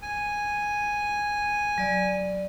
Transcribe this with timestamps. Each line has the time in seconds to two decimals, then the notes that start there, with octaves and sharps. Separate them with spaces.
0.02 G#5
1.78 F#3 D5